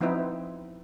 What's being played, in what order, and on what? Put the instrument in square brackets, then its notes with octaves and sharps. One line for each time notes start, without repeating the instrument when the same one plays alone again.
[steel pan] F3 B3 C4 D#4 E4